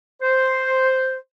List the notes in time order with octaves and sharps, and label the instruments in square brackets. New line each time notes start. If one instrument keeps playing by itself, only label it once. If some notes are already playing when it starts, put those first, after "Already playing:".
[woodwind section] C5